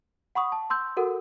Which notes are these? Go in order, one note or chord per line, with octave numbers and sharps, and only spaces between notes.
F#5 B5 C#6 D#6
A5
C6 E6 G6
F#4 A4 A#4 F#5